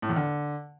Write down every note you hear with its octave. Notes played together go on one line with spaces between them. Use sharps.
A2
E2
D3